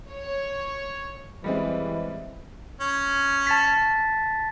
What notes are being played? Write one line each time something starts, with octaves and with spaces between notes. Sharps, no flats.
C#5
E3 G3 G#3 C4
C#4
A5 A6 B6